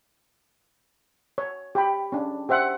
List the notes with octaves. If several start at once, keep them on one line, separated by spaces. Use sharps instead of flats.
C#5
G4 G5 B5
C#4 D4
G4 C5 E5 F#5